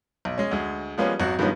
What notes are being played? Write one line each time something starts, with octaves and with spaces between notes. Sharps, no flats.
B1
G#3 C#4
D2 G#3
F3 G3 G#3 A#3 B3 C#4
G#1 F#3 F#4
G2 D#3 F3 G#3 B3 C#4